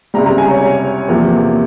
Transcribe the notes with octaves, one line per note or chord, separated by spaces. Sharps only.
C#2 C3 G3 A#5
A#5
G#5
C#5
C#5
E2 C3 F3 A#3